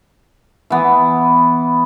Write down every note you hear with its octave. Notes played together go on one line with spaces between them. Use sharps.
E3 B3